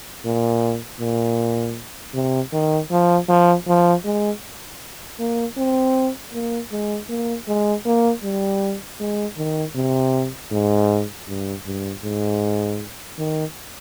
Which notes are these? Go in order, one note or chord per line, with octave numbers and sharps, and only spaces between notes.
A#2
A#2
C3
D#3
F3
F3
F3
G#3
A#3
C4
A#3
G#3
A#3
G#3
A#3
G3
G#3
D#3
C3
G#2
G2
G2
G#2
D#3